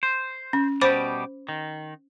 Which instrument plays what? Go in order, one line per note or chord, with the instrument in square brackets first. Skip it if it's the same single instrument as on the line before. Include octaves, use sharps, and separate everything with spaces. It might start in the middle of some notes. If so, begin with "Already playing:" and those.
[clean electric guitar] C5
[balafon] C#4
[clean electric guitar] B2 G3 G4 [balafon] C5 B5 D6
[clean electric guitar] D#3